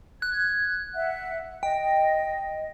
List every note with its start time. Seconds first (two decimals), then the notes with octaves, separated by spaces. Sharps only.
0.22 F#6 G#6
0.95 E5 F#5
1.63 D#5 G5